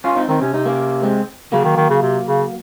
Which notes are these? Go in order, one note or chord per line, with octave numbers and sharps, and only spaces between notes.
C#4 F4
C4 D#4
D#3 C4 D#4
C3 C#4
C3 D#4
A#3 C#4
G#3 C4
C#3 F#3 A#3
D#3
D#3
C#3
C3
C#3